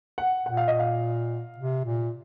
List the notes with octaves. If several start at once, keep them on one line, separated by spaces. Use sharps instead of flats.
F#5
A#2 F#5
F5
D#5
F5
C3
A#2